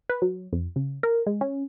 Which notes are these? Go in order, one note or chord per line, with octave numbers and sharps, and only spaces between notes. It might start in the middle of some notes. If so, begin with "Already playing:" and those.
B4
F#3
F2
C#3
A#4
G#3
C#4